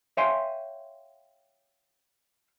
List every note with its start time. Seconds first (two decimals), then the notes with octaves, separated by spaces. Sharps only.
0.17 C#5 E5 F5 G5 G#5 C6